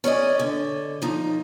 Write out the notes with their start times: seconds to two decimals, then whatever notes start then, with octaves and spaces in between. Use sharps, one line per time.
0.04 C#4 G#4 D5 D#5
0.39 D3
1.02 F3 D#4